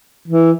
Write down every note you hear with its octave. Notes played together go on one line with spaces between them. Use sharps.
E3